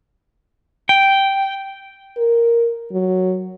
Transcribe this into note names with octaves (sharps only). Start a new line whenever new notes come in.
G5
A#4
F#3